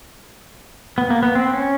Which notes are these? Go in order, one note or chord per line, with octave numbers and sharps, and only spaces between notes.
B3
A#3
B3
C4
C#4